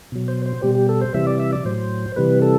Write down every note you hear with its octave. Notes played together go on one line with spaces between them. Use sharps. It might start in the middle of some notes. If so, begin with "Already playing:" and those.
B2 F#3
C5
C5
B2 G3 G4
G4
A4
C5
C3 E3 G3 E5
D5
E5
D5
A2 F#3 C5
C3 E3 G3 B4
A4